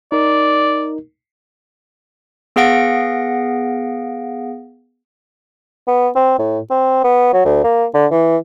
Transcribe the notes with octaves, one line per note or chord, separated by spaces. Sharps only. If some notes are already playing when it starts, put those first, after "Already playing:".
D#4 A#4 D5
B3 G#4 F5 F#5 A#6 D7
B3
C4
A2
C4
B3
F#3
D2
A#3
D3
E3